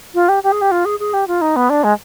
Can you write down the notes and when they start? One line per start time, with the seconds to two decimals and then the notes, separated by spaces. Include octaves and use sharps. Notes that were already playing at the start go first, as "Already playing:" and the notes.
0.14 F4
0.29 G4
0.43 G4
0.52 G#4
0.62 G4
0.71 F4
0.85 G#4
1.00 G#4
1.14 G4
1.28 F4
1.41 D#4
1.56 B3
1.70 D4
1.84 G#3